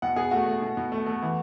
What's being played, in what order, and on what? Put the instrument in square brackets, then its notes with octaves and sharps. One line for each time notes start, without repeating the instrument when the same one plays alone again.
[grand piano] B2 F#5
B2 G#4
A3 F#4
A3
B2
B2
A3
A3
E3